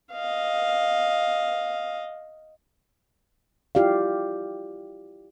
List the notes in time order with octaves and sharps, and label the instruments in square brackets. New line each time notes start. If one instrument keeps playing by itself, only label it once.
[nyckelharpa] D#5 F5
[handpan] E4 F4 G4 D5 F5